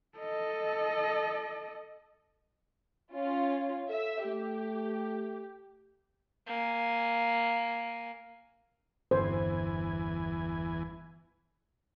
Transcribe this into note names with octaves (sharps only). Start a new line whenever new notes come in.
A4 D#5
C#4 F4
A4 E5
A3 G4
A#3 G#5
G1 E2 E3 C5 G#5